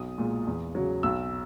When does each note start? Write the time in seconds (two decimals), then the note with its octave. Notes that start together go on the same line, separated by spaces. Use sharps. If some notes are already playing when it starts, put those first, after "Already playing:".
Already playing: B1 D#6
0.18 A#2 G#3
0.47 E2
0.75 C#3 F#3
1.03 B1 E6